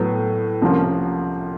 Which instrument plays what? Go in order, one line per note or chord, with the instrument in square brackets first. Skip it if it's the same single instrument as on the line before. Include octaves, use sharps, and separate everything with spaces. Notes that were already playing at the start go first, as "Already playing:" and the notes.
Already playing: [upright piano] A2 F#3 B3
C2 C3 F3 A#3 C#4